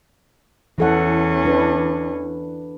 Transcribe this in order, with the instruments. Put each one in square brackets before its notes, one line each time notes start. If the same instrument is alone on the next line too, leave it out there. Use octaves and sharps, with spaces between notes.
[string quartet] E2 C#4 [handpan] E3 A4 F#5
[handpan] D4 B4